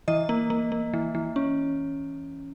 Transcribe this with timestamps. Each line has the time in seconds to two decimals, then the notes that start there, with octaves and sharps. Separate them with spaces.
0.08 E3 D#5
0.29 A#3
0.50 A#3
0.72 A#3
0.93 E3
1.15 E3
1.36 C#4